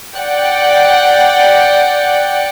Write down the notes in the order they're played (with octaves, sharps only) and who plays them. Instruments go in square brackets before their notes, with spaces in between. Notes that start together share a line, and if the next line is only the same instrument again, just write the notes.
[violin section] D5 F#5 G5